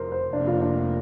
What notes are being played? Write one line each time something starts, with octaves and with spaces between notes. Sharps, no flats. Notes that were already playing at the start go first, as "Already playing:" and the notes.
Already playing: F1 F2 C3 A#4 C5
C5
F1 F2 C3 A#3 D4
F4
D4